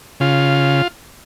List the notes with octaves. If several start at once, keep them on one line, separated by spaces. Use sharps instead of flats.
C#3 F4